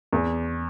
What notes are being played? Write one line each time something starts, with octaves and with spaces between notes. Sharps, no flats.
E2